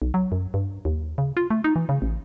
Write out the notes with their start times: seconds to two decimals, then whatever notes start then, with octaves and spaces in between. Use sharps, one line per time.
0.02 B1
0.14 F#3
0.32 F#2
0.54 G2
0.85 D#2
1.18 C#3
1.37 F4
1.50 A3
1.64 D#4
1.76 E3
1.89 C#3
2.02 A1